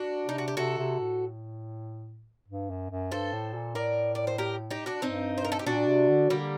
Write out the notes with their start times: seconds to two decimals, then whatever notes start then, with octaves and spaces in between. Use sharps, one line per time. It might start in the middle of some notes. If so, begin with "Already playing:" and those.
Already playing: D4 F#4
0.25 C3 D#4
0.38 F#4
0.48 G4
0.57 C3 F#4 A4
0.78 C3
1.00 A2
2.48 G2
2.70 F#2
2.90 F#2
3.11 G2 A4 C5
3.33 A2
3.54 A#2
3.75 A2 A#4 D5
4.15 D5
4.27 C5
4.38 G4 A#4
4.70 D#4 G4
4.86 D4 F#4
5.02 G2 C4 D#4
5.38 C5
5.45 A#4
5.52 A4
5.59 G4
5.66 A#2 D4 F#4
5.87 C3
6.09 D3
6.29 D3 G3 A#3